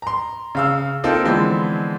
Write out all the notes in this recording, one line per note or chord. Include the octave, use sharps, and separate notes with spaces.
A#5 C6
C#3 F5 E6
A#3 C4 D#4 F4 A4
D3 E3 F3 G#3 B3 C4